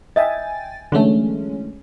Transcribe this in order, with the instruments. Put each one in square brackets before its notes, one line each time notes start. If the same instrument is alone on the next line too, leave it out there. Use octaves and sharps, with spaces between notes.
[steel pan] D#5 E5 [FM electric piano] G5 G#5 A6
[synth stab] D3 E3 A3 [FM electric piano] F#3 G#3 C#4